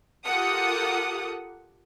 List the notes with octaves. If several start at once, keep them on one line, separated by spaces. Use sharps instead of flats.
F4 G4 A4 A#4 F#5 D#6